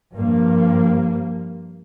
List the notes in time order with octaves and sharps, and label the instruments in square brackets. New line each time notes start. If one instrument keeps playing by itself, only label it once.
[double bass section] G2 F3 A#3